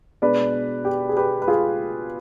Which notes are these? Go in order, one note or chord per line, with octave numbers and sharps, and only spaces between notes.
B2 G#3 D4 B4 D5
G4
G#4
G4 B4
B4
F4 G#4